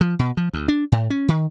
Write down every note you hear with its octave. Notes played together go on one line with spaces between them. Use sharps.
F3
B2
F3
D2
D4
A2
C#4
D#3